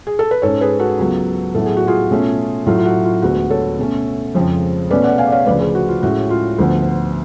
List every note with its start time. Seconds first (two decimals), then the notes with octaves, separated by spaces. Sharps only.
0.07 G#4
0.19 A4
0.31 B4
0.42 G#2 G#3 C#4 A4 C#5
0.61 G#4 B4
0.80 F#4 A4
0.99 C#2 C#3 F#3 B3
1.55 A2 F#3 B3 A4
1.66 G#4
1.77 F#4
1.87 F4 G#4
2.11 B2 A3 C#4
2.66 A2 F#3 A3 F4
2.78 F4
2.85 F#4
3.04 F4
3.22 D2 D3 G#3 B3 F#4
3.50 A4 C#5
3.79 B2 A3 C#4
4.34 F2 C#3 F3 G#3
4.91 B2 A3 C#4 B4 D5
5.04 D5 F#5
5.18 F5 G#5
5.27 D5
5.32 C#5 F5
5.46 D2 C#3 F3 B4 D5
5.60 G#4 B4
5.75 F#4
5.88 F4
6.03 A2 G#3 C#4 F#4
6.30 F4
6.58 D2 D3 F3 B3